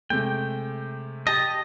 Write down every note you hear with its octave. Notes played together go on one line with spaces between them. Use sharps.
C3 G#3 A3 G5
G4 D#5 A5 A#6